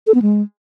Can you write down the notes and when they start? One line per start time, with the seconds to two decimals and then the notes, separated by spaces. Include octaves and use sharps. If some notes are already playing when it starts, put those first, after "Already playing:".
0.07 A4
0.14 B3
0.22 G#3